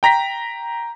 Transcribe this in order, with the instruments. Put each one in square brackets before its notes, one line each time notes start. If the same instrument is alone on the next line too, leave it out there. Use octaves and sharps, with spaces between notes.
[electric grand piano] G5 A#5 A#6 B6